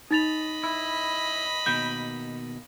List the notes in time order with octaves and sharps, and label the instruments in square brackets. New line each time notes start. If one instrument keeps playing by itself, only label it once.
[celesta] D#4 A6 F7 [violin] D#5 B5
[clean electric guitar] E4
[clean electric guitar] B2 D#3 A#3 [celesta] G6